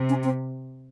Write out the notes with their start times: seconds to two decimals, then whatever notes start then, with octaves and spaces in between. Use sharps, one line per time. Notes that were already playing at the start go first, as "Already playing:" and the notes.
Already playing: C3
0.09 C#4
0.23 C4